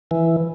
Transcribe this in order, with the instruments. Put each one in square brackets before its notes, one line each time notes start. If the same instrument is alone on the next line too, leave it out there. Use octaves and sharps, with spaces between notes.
[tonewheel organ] E3